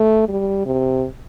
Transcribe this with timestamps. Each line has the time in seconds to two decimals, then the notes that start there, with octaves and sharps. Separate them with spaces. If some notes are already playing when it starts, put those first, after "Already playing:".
Already playing: A3
0.28 G3
0.66 C3